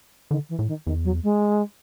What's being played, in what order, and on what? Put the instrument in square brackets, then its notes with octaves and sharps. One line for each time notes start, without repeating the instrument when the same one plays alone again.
[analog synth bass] D3 [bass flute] D#3
[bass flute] E3
[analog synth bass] A2
[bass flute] D#3
[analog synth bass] E2 [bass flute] D#3
[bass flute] F#3
G#3